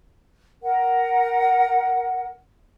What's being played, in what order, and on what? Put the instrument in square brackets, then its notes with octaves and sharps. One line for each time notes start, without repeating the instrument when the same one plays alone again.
[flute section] A#4 F#5